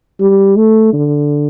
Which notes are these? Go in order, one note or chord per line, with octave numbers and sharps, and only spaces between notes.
G3
A3
D3